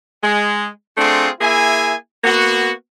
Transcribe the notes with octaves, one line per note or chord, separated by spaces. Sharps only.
G#3
A3 C4 D4 F4 G#4
A#3 E4 G#4 E5 G#5
A#3 B3 F#4